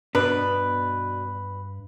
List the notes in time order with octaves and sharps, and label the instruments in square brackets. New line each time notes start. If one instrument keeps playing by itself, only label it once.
[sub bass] G2 [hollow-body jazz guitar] B2 B3 D4 [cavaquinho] B4